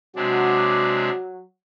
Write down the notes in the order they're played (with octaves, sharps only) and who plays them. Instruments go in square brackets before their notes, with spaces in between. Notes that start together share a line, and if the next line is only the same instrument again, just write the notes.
[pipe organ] C3 G#3 D4 [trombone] F#3 [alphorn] F#4